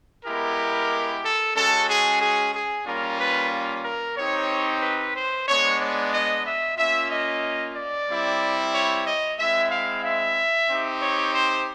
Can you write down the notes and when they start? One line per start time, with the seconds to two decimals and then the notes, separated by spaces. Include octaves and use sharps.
0.25 G#3 B3 E4 G4 A#4
1.23 A4
1.55 G#3 C#4 F#4 A4
1.88 G#4
2.20 G#4
2.54 G#4
2.85 G3 A#3 C#4 F4 A#4
3.19 B4
3.84 A#4
4.16 C4 D#4 G4 C#5
4.82 B4
5.14 C5
5.47 G#3 B3 D4 C#5
5.79 D5
6.12 D#5
6.45 E5
6.77 A#3 C#4 F4 E5
7.10 D#5
7.75 D5
8.08 G3 C4 E4
8.73 C#5
9.06 D#5
9.38 G#3 C4 E4 E5
9.70 F5
10.04 E5
10.68 C4 D#4 G4
11.02 C#5
11.34 C5